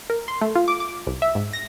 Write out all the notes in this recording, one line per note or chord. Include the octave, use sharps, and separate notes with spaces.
A#4
C6
A3
F4
D6
D6
C2
E5
G#2
A#6